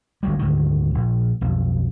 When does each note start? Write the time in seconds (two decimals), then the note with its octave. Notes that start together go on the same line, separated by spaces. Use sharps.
0.23 G1 D2 F#3 G3
0.39 D2 G#2 D3 D#3
0.94 A#1
1.41 B1 F2